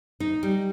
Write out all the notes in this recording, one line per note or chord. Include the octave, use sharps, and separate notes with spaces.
D#4
G3